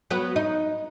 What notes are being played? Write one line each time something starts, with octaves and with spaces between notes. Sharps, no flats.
F#3 B3 B4
D#4